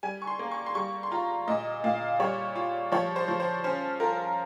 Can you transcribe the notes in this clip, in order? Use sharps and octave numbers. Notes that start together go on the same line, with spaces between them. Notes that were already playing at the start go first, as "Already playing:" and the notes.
G3 G#5
C#6
C6
A#3
C#6
C6
G3 C#6
C6
F4 A#5
A#2 D#5
A#2 F5
G3 C#5
F4
F3 C#5
C5
F3
C5
C#4 C5
F4 A#4